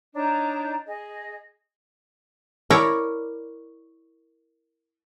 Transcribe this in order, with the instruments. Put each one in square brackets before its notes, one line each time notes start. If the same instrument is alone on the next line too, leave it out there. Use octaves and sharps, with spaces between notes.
[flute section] D4 D#4 C#5 A#5
G#4 D#5
[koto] E4 A#4 C#5 D5